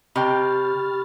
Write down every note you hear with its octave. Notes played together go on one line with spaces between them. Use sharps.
C3 G4 D#5 G5 B5 C#6 F6 A6